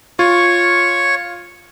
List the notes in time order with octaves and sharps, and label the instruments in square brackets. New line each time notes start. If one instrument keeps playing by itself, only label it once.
[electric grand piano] F4 [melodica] C#5 C#6